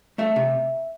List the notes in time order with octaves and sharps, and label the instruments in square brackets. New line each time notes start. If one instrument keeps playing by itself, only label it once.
[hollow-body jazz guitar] A3 E5
C3